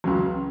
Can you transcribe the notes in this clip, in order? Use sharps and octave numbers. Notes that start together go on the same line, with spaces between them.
C#2 C#3 F#3